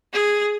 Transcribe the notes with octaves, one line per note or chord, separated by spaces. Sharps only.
G#4